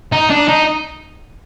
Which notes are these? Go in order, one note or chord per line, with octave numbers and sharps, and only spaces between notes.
D#4
D4
D#4